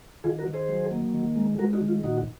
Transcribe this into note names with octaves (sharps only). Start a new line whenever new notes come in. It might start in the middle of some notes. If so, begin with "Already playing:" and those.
D#3 F4 G#4
F#4 A#4
D#3
G#4 C5
F#3
A#3
D#3
G#3
G#3 F#4 A#4
D#4 F#4
D#3
F4
A#2 D#4 F#4